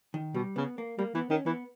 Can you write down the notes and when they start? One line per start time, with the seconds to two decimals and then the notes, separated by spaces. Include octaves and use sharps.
0.14 D#3
0.34 B2 G3
0.56 C#3 B3
0.78 A#3
0.98 G3 A#3
1.14 E3 B3
1.30 D#3 C#4
1.46 E3 B3